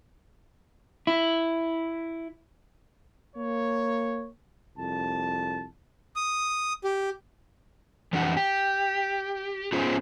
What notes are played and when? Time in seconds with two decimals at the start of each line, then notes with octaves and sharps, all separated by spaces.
1.07 E4
3.36 A#3 C#5
4.78 C2 F2 A5
6.16 D#6
6.84 G4
8.13 F2 E3 D4 G4 F#5
8.37 G4
9.73 B3 C#4 F4 G#4 C5